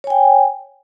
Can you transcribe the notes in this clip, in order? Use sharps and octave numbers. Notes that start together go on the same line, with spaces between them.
C#5 G5 G#5